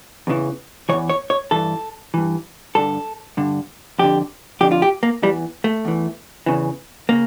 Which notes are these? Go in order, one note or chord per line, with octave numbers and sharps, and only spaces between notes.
E2 C#3 E3
E2 C#3 E3 C#5
C#5
C#5
G2 E3 A4
G2 E3
G2 D3 A4
G2 D3
F2 D3 G4
F2 D3 G4
F4
G4
A#3
E2 E3 G3
A3
E2 E3
E2 C#3 E3
C#3 A#3